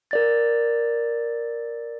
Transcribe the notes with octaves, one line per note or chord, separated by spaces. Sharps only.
A#4 D5 A6